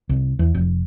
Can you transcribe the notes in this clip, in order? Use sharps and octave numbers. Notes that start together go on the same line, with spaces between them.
C2
E2
F1